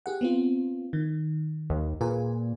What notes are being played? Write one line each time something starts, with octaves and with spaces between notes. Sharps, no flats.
G4 G#4 F#5
B3 C4 F4
D#3
D#2
A#2 G#4 B4 G#5